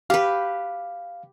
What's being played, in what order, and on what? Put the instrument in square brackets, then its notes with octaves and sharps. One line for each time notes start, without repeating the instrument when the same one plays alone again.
[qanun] G4 B4 [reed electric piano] F5